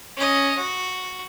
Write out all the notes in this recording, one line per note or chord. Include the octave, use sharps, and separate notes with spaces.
C#4 D#5
F#4